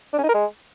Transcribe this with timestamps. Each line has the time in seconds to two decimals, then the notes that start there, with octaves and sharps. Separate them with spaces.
0.13 D4
0.18 C#4
0.24 D#4
0.29 A#4
0.34 G#3